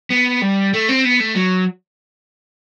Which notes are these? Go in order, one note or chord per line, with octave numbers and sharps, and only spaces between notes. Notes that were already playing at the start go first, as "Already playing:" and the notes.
B3
G3
A3
C4
B3
A3
F#3